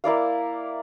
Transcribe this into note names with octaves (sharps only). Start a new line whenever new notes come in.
A#3 E4 D5 F5